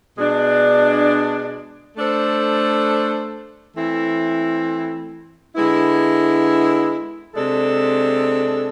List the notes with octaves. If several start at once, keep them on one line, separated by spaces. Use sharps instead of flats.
B2 G#3 D4
A3 D4 A4 C5
E3 A3 C4 E4
D3 G#3 B3 E4
C3 G#3 D4 A4